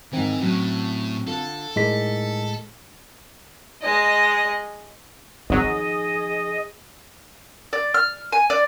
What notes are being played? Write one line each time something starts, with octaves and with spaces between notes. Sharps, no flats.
G#2 D#3 E3 C4
A2 F#3 C#4
D3 F4 A4
A2 G#3 D#4 A#4 D5 B6
G#3 D#5
G#1 F3 F#3 D#4 G#4 D#5
D5
F6
G#5
D5